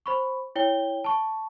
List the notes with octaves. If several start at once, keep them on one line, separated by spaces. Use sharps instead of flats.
C5 B5 C#6
E4 C#5 G5 G7
A5 C#6